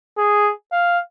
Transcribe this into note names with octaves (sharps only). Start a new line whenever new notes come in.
G#4
F5